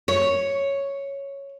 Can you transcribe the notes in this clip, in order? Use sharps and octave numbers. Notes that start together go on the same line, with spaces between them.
C#5